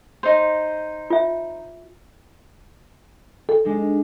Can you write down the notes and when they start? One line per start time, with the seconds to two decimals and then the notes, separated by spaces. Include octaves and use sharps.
0.23 D#4 C5
1.10 F4 E5
3.49 A4
3.65 G#3 D4 D#4